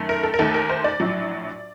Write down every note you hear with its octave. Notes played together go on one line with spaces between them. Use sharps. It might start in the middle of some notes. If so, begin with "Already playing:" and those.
Already playing: F#2 D#3 A3
A#4
A4
A#4
D#2 D#3 A3 A4
A#4
C5
D5
A#1 A2 F#3